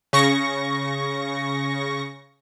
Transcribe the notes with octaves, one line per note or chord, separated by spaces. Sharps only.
C#3 C#6 A#6